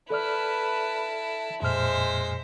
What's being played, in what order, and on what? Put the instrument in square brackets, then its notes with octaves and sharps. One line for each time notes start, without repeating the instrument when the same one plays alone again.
[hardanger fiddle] E4 A5 [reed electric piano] A4 D5 F6 [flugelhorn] B4
[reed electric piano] F2 A#2 F6 [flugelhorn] G#3 [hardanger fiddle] C5 E5